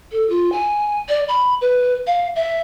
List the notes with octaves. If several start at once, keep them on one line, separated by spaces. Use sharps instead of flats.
A4
F4
G#5
D5
B5
B4
F5
E5